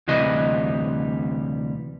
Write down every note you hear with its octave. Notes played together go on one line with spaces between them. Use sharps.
D2 C3 E3 G3 D#5